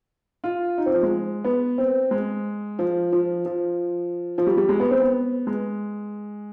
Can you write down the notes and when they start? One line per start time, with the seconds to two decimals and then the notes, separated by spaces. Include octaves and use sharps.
0.44 F4
0.78 D#4
0.86 C4
0.94 F3
1.03 G#3
1.44 B3
1.78 C4
2.11 G#3
2.79 F3
3.12 F3
3.45 F3
4.38 F3
4.47 G3
4.57 G3
4.69 G#3
4.80 B3
4.91 C4
5.02 B3
5.47 G#3